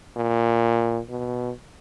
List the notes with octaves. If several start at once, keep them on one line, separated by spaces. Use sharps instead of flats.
A#2
B2